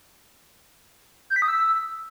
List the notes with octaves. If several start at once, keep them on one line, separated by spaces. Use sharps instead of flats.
G6
B6
D#6
E6